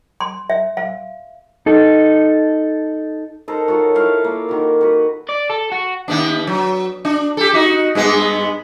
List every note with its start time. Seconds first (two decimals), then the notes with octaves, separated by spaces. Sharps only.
0.20 C6
0.50 E5
0.77 F5
1.66 D#4 A4
3.48 D#4 A4 A#4 C5
3.68 F#3 D#4 F4 F#4
3.95 E4 F4 F5 C#6
4.24 A#3
4.49 D#3 F#4
4.81 F#4 B4
5.29 D5
5.49 A4
5.72 F#4
6.08 D#2 B3 D4
6.47 F#3
7.05 D4
7.37 G4 A4
7.54 D#4 F#4
7.95 G2 G#3 B3